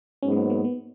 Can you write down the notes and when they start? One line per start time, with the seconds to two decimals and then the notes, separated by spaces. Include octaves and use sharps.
0.22 G#2 F#3 B3 C#4
0.32 G#3
0.37 A#3
0.50 A#3
0.64 B3